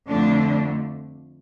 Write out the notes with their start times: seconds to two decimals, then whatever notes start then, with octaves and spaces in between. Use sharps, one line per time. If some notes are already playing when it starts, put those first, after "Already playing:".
0.09 F2 D3 A3 D4